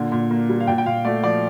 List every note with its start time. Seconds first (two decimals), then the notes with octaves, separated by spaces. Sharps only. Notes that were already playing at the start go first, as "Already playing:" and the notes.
Already playing: A#2 D3
0.12 A#2
0.31 A#3
0.49 G3
0.60 F5
0.67 A#2 G5
0.78 G5
0.86 A#2 F5
1.05 A3 D5
1.24 F3 D5